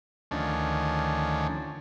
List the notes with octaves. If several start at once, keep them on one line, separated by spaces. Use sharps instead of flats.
D2 D#3 F3 C#4 D4